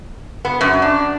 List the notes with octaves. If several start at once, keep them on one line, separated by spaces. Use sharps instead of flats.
B3
F#2
D4